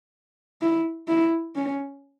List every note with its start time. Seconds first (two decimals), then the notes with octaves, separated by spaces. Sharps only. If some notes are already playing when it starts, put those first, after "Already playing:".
0.62 E4
1.08 E4
1.56 C#4